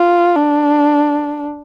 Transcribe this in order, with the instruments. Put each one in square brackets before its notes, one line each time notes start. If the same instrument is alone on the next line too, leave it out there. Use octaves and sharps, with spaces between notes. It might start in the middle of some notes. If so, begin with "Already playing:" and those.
Already playing: [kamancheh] F4
D4